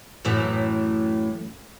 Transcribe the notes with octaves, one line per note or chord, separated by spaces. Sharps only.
F#2 A2 E3